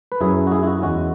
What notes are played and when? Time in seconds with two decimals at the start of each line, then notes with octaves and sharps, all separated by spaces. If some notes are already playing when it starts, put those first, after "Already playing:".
0.12 B4
0.20 F#2 F#3 C#4 E4 G#4
0.47 F#4
0.52 E4 G#4
0.63 E4
0.67 F#4
0.82 E2 E3 G#3 C#4 F#4